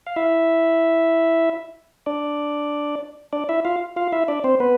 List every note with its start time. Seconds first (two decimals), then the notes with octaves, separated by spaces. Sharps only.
0.07 F5
0.16 E4 E5
2.06 D4 D5
3.33 D4 D5
3.49 E4 E5
3.65 F4 F5
3.96 F4 F5
4.12 E4 E5
4.28 D4 D5
4.44 C4 C5
4.60 B3 B4